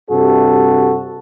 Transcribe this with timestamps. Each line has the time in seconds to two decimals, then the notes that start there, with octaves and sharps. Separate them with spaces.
0.10 G2 C3 F#4 A4